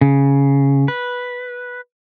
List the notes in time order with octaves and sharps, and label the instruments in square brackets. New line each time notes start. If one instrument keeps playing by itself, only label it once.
[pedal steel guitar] C#3
B4